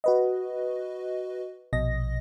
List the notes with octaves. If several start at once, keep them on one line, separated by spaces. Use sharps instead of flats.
F#4 B4 D#5
A#1 B2 D#5 A#6